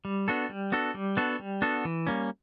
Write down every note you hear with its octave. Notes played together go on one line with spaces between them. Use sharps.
G3
B3 D4 F#4 A4
G3
B3 D4 F#4 A4
G3
B3 D4 F#4 A4
G3
B3 D4 F#4 A4
E3
G3 A#3 C#4